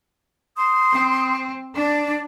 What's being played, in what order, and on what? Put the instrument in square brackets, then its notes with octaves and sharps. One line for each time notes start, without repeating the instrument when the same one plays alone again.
[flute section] C6 D#6
[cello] C4
[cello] D4 [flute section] D5